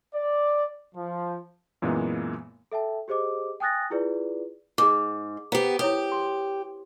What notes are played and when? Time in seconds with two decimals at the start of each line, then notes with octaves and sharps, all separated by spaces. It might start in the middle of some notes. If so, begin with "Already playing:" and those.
0.14 D5
0.95 F3
1.82 F#2 A#2 E3 G#3 A#3 B3
2.72 A4 E5 G5 A5
3.08 G4 G#4 C5 D#5 D6
3.60 G5 G#5 D#6 F#6 A6 A#6
3.90 E4 F4 G#4 B4 D5
4.78 G#2 G#4 D6
5.52 B3 G4 C5 F#5 A#5
5.79 E4 G4 C#5 D#6
6.12 C6